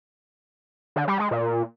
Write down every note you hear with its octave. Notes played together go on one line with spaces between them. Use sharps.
D3
G3
G#3
A#2